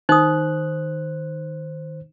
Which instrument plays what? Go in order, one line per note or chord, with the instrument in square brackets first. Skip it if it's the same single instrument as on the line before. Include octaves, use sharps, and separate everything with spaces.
[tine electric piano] D#3 C5 F#6 [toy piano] D#4 D#6